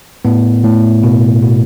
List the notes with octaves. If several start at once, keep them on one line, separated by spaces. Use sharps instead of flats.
A2 B3
A2
B2
B2